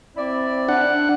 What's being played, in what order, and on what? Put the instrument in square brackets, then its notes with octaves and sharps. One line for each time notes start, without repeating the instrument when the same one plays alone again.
[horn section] C4 E4 D5
[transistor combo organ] D4 F#5